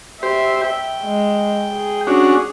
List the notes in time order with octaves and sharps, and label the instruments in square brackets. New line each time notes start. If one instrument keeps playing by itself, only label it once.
[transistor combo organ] G4 C5 [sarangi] E5
[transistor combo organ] G5
[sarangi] G#3
G#4
[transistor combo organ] C#4 D4 F#4